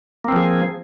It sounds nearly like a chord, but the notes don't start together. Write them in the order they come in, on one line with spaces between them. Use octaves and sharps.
A#3 C4 F3 G#4